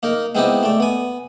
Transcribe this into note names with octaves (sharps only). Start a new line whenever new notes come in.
A#3 D#4 A#4
G#3 B3 C4 D#4 E4 G4
A3 D5
B3 G#5